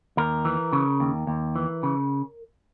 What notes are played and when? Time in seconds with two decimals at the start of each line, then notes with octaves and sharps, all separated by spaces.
0.17 D#2 A#4
0.45 E3
0.73 C#3
1.00 D#2
1.27 D#2
1.56 E3
1.83 C#3